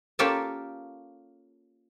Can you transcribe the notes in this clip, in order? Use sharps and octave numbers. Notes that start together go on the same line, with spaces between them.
A#3 C#4 F4 G4 A4 A5